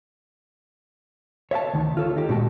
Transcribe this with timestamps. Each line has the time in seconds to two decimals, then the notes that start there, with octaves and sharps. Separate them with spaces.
1.51 C#5 E5 F5 A5
1.74 D2 D#3
1.97 F4 A4 C#5
2.17 D#4 G4
2.29 A#2 D3 G#3 F#4 G5 A5